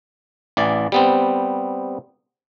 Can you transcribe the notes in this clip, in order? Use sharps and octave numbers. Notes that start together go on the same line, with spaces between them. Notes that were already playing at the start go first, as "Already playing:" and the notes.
A1 E3 D5
G3 B3 C4